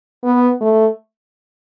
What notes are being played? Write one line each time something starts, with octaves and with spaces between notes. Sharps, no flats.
B3
A3